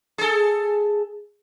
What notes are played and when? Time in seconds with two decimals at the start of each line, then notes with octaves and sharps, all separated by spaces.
0.18 G#4 A4